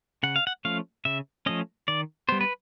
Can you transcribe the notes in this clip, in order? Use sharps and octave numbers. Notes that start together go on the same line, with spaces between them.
C#3 F#5
F5
F#5
F3 A3 C#4 F5
C#3 E5
F3 A3 C#4 D#5
D#3 D5
G3 B3 C5
B4